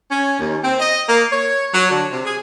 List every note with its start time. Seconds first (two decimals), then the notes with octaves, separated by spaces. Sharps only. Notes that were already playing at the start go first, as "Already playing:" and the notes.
0.10 C#4
0.39 D#2
0.63 C4
0.79 D#5
1.08 A#3
1.31 C#5
1.73 F#3
1.90 D3
2.11 C3
2.25 G#4